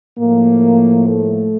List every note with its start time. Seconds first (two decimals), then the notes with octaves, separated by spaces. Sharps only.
0.19 A2 F3 A#3
1.08 A3